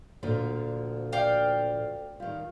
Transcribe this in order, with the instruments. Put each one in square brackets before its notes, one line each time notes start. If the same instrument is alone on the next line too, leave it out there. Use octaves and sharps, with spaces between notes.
[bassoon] D2 [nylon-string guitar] A#2 D3 F3
[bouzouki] D5 F5 G5
[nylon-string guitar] D#3 G3 [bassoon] F4